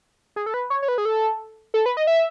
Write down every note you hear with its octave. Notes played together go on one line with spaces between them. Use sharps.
G#4
A4
B4
C#5
C#5
B4
G#4
A4
A4
B4
D#5
E5